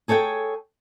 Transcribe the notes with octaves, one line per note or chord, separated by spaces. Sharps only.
G#4 A4 C#5 F#5 G5